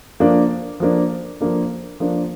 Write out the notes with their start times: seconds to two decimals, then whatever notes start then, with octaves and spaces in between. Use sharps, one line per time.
0.20 F3 A#3 D4
0.80 F3 A#3 D4
1.41 F3 A#3 D4
2.00 F3 A#3 D4